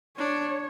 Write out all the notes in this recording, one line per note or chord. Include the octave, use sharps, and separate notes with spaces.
D4 C#5